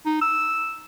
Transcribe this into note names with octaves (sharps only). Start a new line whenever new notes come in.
D#4
E6